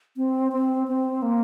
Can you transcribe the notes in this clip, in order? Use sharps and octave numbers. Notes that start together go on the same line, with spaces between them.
C4
C4
C4
A#3